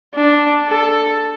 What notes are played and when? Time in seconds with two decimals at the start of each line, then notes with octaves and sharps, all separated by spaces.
0.14 D4
0.68 A4